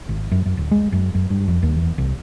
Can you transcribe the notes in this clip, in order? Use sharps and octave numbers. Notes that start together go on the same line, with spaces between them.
G#1
F#2
F#2
D1
G#3
F#2
F#2
G2
F2
D#2
E2
C2